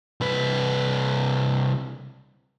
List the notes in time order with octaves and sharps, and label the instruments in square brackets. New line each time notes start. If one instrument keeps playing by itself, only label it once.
[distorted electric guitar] C2 B4